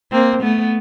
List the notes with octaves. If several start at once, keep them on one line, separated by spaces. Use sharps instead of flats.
A#3 C4
A3 B3